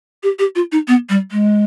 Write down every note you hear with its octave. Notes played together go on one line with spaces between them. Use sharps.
G4
G4
F4
D#4
B3
G3
G#3